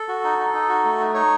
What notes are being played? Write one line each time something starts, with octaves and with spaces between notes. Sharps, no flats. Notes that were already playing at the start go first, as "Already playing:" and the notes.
Already playing: A4
F#4
D#4
D#4
D#4
F#4
A3
D#4
D#4 C#5